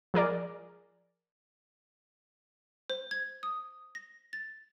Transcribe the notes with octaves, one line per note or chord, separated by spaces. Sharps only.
F3 G#4 A#4 D5
C5
G#6
D#6
A#6
A6